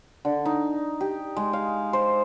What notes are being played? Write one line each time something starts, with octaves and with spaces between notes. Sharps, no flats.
D3
D#4
G4
G#3
F5
C5